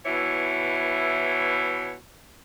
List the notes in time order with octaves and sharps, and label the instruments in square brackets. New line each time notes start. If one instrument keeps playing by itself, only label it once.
[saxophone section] B2 E3 E4 C#5